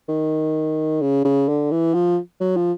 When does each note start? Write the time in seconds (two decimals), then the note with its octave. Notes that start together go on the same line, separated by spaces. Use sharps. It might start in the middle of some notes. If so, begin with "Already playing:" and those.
0.09 D#3
1.01 C#3
1.25 C#3
1.48 D3
1.71 E3
1.94 F3
2.41 F#3
2.56 F3